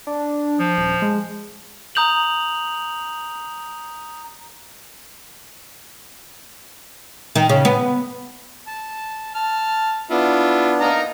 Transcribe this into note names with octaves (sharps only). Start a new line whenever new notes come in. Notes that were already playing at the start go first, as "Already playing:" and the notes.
D4
F3
D#1
G#3
A#5 D#6 G6 F7 F#7
D#3
C#3
B3
A5
A5 F6
B3 D4 E4 F4
D#4 F5 A#5